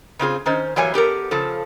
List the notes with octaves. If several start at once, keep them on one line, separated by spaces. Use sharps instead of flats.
C#3 C4 F4 G#4
D#3 C#4 C5
E3 F#3 G3 A#3 C#5 G#5
B3 G4 A4 A#4
C#3 F3 A4